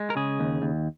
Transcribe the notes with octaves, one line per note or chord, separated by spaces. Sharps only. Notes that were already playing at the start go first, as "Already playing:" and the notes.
Already playing: G#3
A#4
C#3 G#4
D#2
D#2